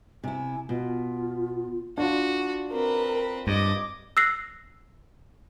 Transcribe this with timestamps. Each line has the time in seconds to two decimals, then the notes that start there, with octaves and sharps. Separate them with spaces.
0.24 C3 E4 G#5
0.69 B2 F4
1.98 D4 F4 F#4
2.72 C4 A#4 B4
3.47 G2 D#5 D6
4.17 E6 F#6 A#6 C7